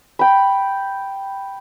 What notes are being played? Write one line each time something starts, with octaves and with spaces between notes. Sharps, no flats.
G5 B5